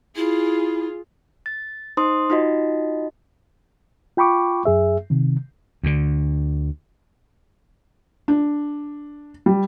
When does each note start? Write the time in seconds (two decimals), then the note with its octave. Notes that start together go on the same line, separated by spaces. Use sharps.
0.16 E4 F4 G#4
1.46 A6
1.97 D#4 C5 C6 D#6
2.30 D#4 F4 F#4 D#5
4.17 F4 G5 B5 C#6 D6
4.65 F#2 G#4 E5
5.10 C3 D#3
5.83 D2 D3
8.28 D4
9.46 G3